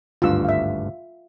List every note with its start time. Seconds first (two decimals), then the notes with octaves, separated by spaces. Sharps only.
0.22 G#1 D2 G2 F4 E6
0.45 E5 F5